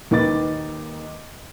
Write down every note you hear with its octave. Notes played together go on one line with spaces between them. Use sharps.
D#2 D#3 D#4 B4 D6 A6